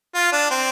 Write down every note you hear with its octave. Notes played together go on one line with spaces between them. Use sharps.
F4
D4
C4